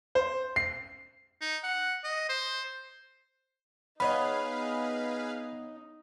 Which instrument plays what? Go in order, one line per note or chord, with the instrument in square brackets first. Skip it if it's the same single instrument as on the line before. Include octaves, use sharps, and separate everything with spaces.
[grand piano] C5
C7
[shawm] D#4
F#5
D#5
C5
[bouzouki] B3 C#5 D#5 [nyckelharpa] D#4 [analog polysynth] G#4 B4 F5 [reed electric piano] B5